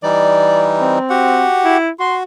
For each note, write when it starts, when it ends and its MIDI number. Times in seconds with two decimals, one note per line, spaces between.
0.03 0.99 52
0.03 0.99 55
0.03 0.99 63
0.03 0.68 74
0.81 1.45 60
1.10 1.77 66
1.10 1.77 67
1.10 1.77 78
1.65 1.90 64
2.00 2.23 66
2.00 2.16 84